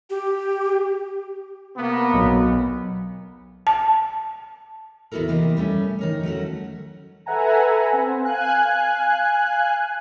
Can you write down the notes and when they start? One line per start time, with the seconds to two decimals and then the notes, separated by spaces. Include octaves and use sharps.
0.10 G4
1.77 C3 A#3 B3
2.14 B1
3.67 A5
5.12 D#2 B3 E4 F#4 A4 A#4
5.28 C3 E3 A#3 G4 D#5
5.57 G3 A3 C#4
5.99 D#3 A#4 C#5
6.23 F#3 A3 C#4 F#4
7.26 A4 B4 E5 F#5 G#5 A#5
7.93 C4
8.24 F5 G#5 F#6